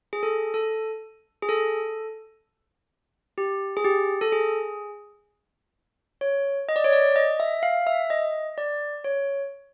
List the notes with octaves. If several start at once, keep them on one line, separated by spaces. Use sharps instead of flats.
G#4
A4
A4
G#4
A4
G4
G#4
G4
A4
G#4
C#5
D#5
D5
C#5
D5
D#5
E5
F5
E5
D#5
D5
C#5